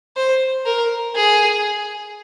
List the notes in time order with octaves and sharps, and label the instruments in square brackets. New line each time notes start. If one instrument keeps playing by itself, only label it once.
[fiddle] C5
A#4
G#4